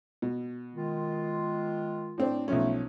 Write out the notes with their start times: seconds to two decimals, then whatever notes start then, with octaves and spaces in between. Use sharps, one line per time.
0.22 B2
0.74 D#3 G#3 F4
2.18 A2 C4 D4
2.48 B1 F3 A3 C#4